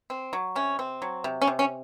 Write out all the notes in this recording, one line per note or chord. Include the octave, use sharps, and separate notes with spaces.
C4
F#3
C3 C#4
C4
F#3
C3
C#4
C3
C#4